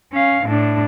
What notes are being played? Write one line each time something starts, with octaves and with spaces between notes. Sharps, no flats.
C#4 F5
A2 D4